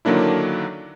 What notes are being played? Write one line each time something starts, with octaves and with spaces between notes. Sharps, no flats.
D3 D#3 F#3 A#3 D4 E4